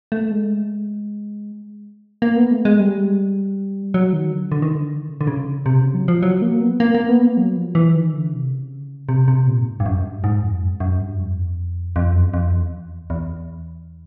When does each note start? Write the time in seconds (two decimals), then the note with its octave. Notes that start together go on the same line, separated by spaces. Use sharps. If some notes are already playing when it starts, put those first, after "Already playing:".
0.12 A3
0.31 G#3
2.22 A#3
2.36 B3
2.51 A3
2.65 G#3
2.80 G3
3.94 F#3
4.13 D#3
4.32 D3
4.52 D3
4.62 D#3
4.75 D3
5.08 C#3
5.21 D3
5.27 C#3
5.66 C3
5.80 C#3
5.94 F#3
6.08 F3
6.23 F#3
6.42 A#3
6.61 B3
6.80 A#3
6.95 A#3
7.09 B3
7.23 A#3
7.37 F#3
7.56 F3
7.75 E3
7.95 D#3
8.14 D3
8.33 C3
8.51 C#3
9.09 C3
9.28 C3
9.47 A#2
9.60 G2
9.66 G#2
9.80 G2
9.86 F#2
10.04 G2
10.24 G#2
10.43 F2
10.61 F#2
10.80 F#2
11.00 G2
11.20 F2
11.96 F2
12.15 F#2
12.34 F2
12.52 E2
13.10 E2